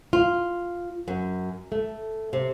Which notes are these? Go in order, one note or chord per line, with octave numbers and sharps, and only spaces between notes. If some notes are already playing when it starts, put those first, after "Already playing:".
F4
F#2
A3
C3